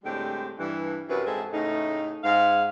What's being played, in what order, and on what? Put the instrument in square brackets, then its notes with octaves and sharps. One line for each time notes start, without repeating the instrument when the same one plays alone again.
[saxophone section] A2 D3 G3 G#3 C4 G4
G2 E3
F#2 C3 B4
G#2 G#3 C4 D#4 A4 E5
A2 C#3 A3 D#4
G#2 F5